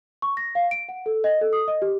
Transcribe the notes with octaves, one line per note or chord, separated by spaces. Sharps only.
C#6
A#6
F5
D7
F#5
A4
D#5
A4
D#6
D#5
G4